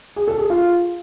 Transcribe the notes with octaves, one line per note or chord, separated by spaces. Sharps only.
G#4
A4
G#4
F4